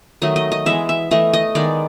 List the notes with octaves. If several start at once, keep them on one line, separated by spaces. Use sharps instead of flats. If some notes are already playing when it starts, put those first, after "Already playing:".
D#3 F#3 A3 D#5
D#5
D#5
E3 G#3 B3 E5
E5
E3 A3 D#5
D#5
D#3 G#3 B3 D5